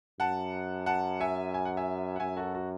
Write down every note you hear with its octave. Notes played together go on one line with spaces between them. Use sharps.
F#2 F#5 A5
F#5 A5
E5 G#5
G#5
F#5
E5 G#5
F#5
F#2 E5 G#5
F#4 A4
F#4